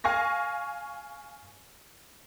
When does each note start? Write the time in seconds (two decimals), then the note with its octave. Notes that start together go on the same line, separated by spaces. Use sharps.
0.04 F5 G#5 C#6 A#6